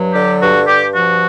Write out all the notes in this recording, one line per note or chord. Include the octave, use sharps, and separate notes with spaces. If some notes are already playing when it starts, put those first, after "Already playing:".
Already playing: G2 F#3
D3 G4
G2 F#4
G2 G4
F3 F#4